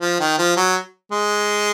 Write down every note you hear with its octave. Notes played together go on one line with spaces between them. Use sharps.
F3
D#3
F3
F#3
G#3